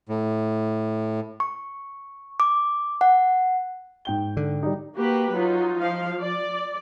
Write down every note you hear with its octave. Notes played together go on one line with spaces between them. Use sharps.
A2
C#6
D6
F#5
G#2 G5 G7
D3
G3 D#4
A#3 F#4 G4 B4
F#3 D#4 F4
F3 F5
D5